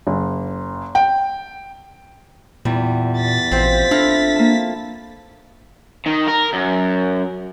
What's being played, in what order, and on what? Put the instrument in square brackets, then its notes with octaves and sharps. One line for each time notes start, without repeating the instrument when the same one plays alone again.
[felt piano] F#1
G5
[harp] E2 [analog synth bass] A#2 [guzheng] G3
[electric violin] A6 B6
[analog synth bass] A1 [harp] F3 [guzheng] C4 C5
[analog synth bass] D4 [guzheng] E4 A4 F5
[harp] A#3 A5
[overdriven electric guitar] D#3
A#4
F#2